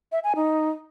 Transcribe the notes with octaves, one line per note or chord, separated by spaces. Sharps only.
E5
G#5
D#4